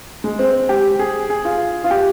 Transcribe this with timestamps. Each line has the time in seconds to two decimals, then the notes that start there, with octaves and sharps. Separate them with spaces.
0.24 G#3
0.39 C4
0.69 G4
0.99 G#4
1.30 G#4
1.45 F4
1.84 F4
1.90 G4